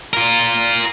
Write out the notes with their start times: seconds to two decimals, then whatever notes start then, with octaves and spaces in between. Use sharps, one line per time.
0.13 F4 A#4